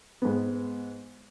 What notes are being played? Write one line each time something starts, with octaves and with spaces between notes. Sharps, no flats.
G#2 B3